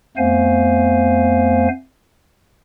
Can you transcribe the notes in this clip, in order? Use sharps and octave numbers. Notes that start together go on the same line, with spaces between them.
F2 A3 B3 C5 F5 G#5